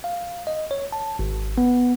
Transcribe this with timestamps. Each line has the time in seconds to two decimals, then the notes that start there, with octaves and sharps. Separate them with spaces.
0.04 F5
0.47 D#5
0.71 C#5
0.92 A5
1.19 G#1
1.58 B3